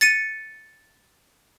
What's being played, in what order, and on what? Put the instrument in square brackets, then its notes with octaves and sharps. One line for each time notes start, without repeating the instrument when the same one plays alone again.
[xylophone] A6 C#7 D#7